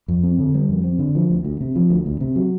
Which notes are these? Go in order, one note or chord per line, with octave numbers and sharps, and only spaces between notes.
F2
C4
D3
G3
F2
C4
D3
F3
D2
D2
C3
F3
D2
D2
C3
F#3